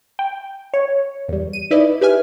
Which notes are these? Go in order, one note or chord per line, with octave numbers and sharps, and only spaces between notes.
G5
C#5
E2 G3
D#7
D#4 E4 B4 D5 D#5
G4 B4 E5 G#5 F6